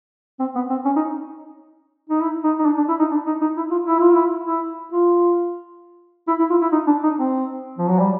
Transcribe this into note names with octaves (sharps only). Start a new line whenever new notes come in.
C4
B3
C4
C#4
D#4
D#4
E4
D#4
D#4
D4
D4
E4
D#4
D4
D#4
D#4
E4
F4
E4
F4
E4
E4
F4
E4
E4
F4
E4
D#4
D4
D#4
C4
F3
F#3
G3